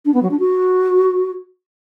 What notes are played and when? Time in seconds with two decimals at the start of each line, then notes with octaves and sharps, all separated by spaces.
0.05 D4
0.14 B3
0.22 F#3
0.31 D4
0.39 F#4